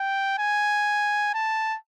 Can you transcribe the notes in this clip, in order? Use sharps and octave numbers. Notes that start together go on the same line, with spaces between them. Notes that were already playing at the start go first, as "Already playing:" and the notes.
Already playing: G5
G#5
A5